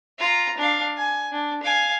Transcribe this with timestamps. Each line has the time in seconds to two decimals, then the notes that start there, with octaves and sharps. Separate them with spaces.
0.18 F4 A#5
0.57 D4 F5
0.97 G#5
1.32 D4
1.63 F5 G#5